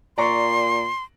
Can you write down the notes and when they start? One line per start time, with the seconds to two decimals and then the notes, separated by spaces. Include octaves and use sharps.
0.18 A#2 D5 A#5 C6 C#6